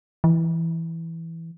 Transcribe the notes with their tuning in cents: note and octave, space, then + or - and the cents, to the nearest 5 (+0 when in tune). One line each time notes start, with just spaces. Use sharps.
E3 +0